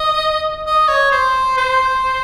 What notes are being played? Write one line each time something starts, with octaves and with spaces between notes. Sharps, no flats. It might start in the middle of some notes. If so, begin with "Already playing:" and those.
Already playing: D#5
D#5
C#5
C5
C5